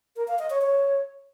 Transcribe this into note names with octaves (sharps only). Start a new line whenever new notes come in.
A#4
F5
D#5
C#5
C#5